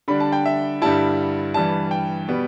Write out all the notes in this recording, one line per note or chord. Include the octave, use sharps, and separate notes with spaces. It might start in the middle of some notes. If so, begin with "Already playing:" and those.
D3 G3 D4 B5
A5
G5
E5
G2 D3 G3 E4 A5
G2 E3 G3 A5
G5
B2 G3 B3